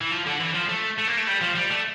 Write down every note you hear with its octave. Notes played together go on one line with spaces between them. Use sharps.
E3
F3
D3
E3
F3
A3
A3
A#3
A3
G3
F3
G3
A3